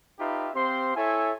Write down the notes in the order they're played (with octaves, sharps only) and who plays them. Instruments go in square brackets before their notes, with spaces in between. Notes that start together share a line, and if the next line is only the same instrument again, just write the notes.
[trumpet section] D#4 F4 G4 B4 E5
C4 G4 C5 F5 C6
E4 A4 C#5 E5 G#5